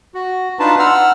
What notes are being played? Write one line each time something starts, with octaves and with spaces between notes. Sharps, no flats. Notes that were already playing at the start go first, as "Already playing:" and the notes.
F#4
D4 D#4 F4 B4 A5
F#5 E6 F6